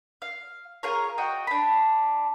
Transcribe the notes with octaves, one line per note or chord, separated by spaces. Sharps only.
F5
F4 G#4 A#4 C#5
F#4 D#5 G5
D4 B5